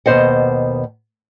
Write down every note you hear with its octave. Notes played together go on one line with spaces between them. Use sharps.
D#2 B2 C5 D#5 F#5